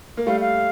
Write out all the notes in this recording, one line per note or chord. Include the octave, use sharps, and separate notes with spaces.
A#3
G3 A3 F5
F5